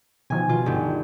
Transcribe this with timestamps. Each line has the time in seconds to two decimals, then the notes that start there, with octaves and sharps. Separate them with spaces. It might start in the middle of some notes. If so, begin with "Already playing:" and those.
0.30 B2 D#3 F3 G#5
0.49 B2 F4
0.66 G1 D#3